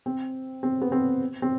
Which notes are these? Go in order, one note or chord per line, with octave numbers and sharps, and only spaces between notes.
C4
C4
B3
C4
C4